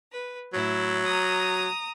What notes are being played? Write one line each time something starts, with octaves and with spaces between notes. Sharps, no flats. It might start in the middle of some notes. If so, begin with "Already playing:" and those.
B4
A2 F#3 E4
A#5 D#6